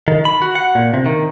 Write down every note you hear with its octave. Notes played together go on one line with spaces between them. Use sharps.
D#3
B5
F#4
F#5
A#2
C3
D#3